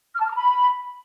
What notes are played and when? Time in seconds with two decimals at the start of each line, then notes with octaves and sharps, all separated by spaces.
0.14 F6
0.20 A5
0.25 F6
0.31 A#5
0.36 B5